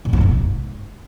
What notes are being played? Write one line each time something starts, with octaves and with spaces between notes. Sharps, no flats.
A#2
G#2
A#2
B2
G#2